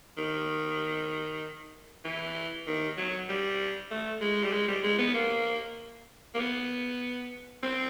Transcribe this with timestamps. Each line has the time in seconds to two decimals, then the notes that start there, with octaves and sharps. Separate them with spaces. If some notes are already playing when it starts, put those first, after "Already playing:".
0.17 D#3
2.05 E3
2.67 D#3
2.97 F#3
3.29 G3
3.91 A3
4.21 G#3
4.44 G3
4.53 G#3
4.68 G3
4.84 G#3
4.99 B3
5.15 A#3
6.35 A#3
6.40 B3
7.63 C4